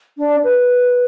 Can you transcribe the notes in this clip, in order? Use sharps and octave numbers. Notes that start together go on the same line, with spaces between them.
D4
B4